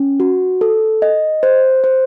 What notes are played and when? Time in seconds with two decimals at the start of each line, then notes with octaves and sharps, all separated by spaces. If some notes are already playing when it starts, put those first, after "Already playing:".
Already playing: C#4
0.20 F#4
0.61 A4
1.02 D#5
1.43 C5
1.84 C5